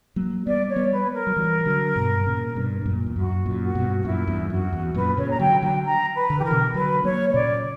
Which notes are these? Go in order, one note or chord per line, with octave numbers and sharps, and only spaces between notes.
F#3 A#3
G3 B3 D5
C#5
G3 B3
B4
A#4
F#3
E3 G3
E3
D3 F#3
G2 B2
A#2 C#3
G2 B2
G2
F#2 A#2
E2
F#2 F#4
F#2 A#2
F#4
G2 B2
F#4
F#2 A#2 E4
E2 G2
F#2 F#4
E2
F#2 A#2 B4
A#2 C#3 C#5
A#5
D3 F#3 G5
D3 F#3 G5
A#5
B4
D3
E3 G4 A#4
B2 D3
D3 F#3 B4
F#3 A#3 C#5
C#5
A#2 C#3 D5